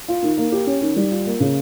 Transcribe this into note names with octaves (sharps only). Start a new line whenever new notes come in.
F4
D#3
A#3
G4
C#4
D#3
G3
F4
A#3
C#3